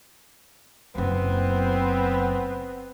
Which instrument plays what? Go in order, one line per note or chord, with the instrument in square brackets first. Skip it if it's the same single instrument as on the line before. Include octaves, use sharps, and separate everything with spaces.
[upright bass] F#1 F#3 [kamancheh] B3 C4